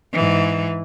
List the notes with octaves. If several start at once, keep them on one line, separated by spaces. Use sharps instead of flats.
G#2 E3